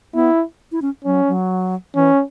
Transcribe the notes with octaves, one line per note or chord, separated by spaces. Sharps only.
B3 E4
E4
C#4
F#3 C#4
F#3
E3 C#4